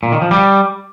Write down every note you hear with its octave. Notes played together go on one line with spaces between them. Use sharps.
A#2
D#3
F3
G3